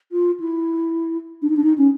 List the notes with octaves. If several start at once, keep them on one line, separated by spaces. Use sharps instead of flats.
F4
E4
D4
D#4
D4
D#4
C#4